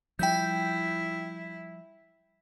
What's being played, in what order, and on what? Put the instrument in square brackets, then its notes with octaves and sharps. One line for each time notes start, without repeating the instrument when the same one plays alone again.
[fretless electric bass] F3 G3 [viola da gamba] E4 [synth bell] G5 G6